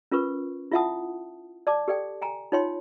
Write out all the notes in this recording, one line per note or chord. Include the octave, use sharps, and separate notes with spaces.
C#4 F4 A#4 B4 C#6
E4 F4 E5 F#5 A5 D#6
D5 A5 D6
G4 A4 D5 G5
G5 G#5 A#5
D#4 F4 C#5 G5 C6